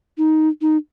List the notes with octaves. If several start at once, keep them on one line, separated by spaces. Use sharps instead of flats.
D#4
D#4